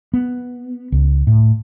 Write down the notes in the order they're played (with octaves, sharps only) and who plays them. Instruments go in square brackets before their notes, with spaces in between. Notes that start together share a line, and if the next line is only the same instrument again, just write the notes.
[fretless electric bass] B3
C#2
A2